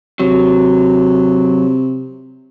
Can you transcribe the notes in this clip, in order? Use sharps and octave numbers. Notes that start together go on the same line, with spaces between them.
C3 F#3